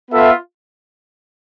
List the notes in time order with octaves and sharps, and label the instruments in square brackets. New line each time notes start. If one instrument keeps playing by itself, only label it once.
[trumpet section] B3 F4 A4 E5